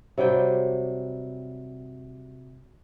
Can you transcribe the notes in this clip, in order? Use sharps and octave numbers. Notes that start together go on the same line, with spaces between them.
C3 F#3 G3 G5